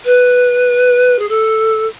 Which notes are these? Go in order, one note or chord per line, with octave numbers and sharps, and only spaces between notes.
B4
G#4
A4